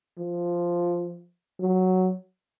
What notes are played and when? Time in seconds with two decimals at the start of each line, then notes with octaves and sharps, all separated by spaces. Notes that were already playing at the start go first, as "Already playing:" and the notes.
0.18 F3
1.60 F#3